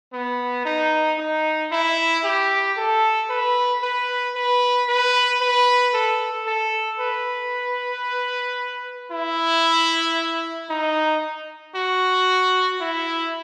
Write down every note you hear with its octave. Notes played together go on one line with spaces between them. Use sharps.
B3
D#4
D#4
E4
G4
A4
B4
B4
B4
B4
B4
A4
A4
B4
E4
D#4
F#4
E4